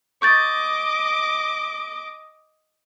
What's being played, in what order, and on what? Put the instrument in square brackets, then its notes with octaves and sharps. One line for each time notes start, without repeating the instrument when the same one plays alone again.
[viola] D#5 D6 [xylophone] C#6 G6 A6